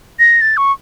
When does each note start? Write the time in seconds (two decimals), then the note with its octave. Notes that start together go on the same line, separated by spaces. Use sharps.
0.19 A#6
0.41 A6
0.57 C#6